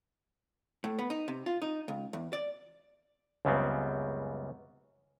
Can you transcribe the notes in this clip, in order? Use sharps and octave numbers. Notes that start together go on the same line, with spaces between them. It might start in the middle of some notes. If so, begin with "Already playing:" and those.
A2
B3
D#4
C3
F4
D#4
C#2
E2
D5
C#2 F#2 C#3 G3 B3 C4